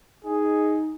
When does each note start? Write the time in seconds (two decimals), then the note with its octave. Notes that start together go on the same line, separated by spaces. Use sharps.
0.24 D#4 G#4